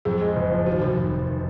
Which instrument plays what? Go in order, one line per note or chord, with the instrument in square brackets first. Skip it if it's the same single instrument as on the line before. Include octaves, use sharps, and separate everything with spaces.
[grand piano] F2 [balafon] G#4
[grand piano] G#3
F#1
F3
[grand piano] D#2 [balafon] F#4
[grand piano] F1 [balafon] F#4
[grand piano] F1
D#3